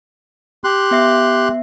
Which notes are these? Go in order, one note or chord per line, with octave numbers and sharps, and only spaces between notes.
G4 C6 F#6
B3 E5 C7